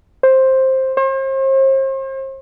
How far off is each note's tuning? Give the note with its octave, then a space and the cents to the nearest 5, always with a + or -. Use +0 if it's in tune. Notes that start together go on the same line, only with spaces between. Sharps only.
C5 +10
C5 +40